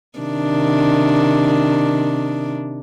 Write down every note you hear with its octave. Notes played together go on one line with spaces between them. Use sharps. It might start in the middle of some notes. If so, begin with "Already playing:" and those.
C3 D#3 D4